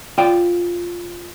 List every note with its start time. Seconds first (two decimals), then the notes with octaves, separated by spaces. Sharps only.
0.18 F4 D5 F5 G5